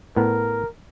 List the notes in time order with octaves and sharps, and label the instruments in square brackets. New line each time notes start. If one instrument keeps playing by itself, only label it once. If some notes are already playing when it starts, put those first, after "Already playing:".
[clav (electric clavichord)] A2 B3 [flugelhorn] A#4